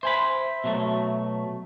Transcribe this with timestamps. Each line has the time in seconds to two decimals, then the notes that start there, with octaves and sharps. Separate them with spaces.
0.03 C5 E5 G#5 B5
0.64 B2 F#3 A3